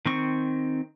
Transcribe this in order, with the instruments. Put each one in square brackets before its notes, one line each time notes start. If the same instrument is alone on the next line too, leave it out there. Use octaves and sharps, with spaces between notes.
[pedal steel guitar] D#3 C4 C#6